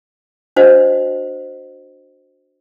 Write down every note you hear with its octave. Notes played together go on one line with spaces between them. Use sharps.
D4 F#4 C5 D#5 F#5